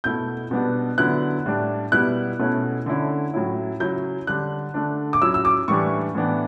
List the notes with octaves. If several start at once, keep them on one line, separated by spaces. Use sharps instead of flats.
B2 A3 E4 G6
B2 G3 B3 D4
D3 F#3 B3 E4 F#6
A2 G3 D4
B2 G3 B3 E4 F#6
B2 A3 C#4 E4
D3 A3 C#4 E4
A2 F#3 C#4 E4
C#3 F#3 C#4 E4 G6
D3 G3 D4 F#6
D3 A3 D4
D6
F#3 C#4 E4 E6
E6
D6
A2 E3 G3 D4 C#6
A2 E3 B3 D4